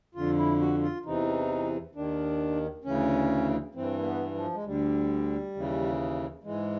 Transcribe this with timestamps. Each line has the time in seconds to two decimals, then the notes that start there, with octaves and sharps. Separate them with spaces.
0.15 F2 D3 F4
0.38 E4
0.60 F#4
0.83 F4
1.05 E2 C3 E3 D#4
1.95 D#2 D#3 D4
2.84 D2 C#3 E3 C#4
3.75 G2 E3 C4
3.99 A#3
4.04 B3
4.35 F3
4.54 G#3
4.64 D2 D3 G3
5.55 D#2 C#3 E3
6.44 G#2 E3 G#3